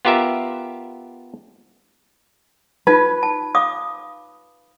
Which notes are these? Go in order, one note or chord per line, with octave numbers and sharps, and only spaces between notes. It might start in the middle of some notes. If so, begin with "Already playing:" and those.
B3 F4 G4 A#4 E5
D#4 F4 B4
A5
F5 D6 D#6